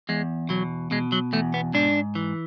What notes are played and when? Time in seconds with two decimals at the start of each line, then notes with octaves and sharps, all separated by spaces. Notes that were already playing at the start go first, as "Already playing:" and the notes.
0.09 E2 G#3
0.49 B2 F#3
0.91 B2 G#3
1.12 F#3
1.33 E2 A3
1.54 B3
1.74 G#2 D4
2.15 E3